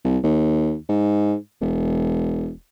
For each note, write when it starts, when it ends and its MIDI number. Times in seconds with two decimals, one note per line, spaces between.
0.05 0.18 36
0.24 0.75 39
0.89 1.36 44
1.61 2.51 28